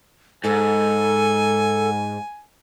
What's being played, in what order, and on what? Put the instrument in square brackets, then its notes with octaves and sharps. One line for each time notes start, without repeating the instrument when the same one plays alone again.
[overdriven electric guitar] G#2 [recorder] A4 [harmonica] G#5